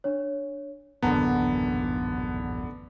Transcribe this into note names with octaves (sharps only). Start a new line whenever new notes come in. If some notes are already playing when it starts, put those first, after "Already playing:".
D4 C#5
D#1 A1 F#2 D3 B3 F#5 A5 A#5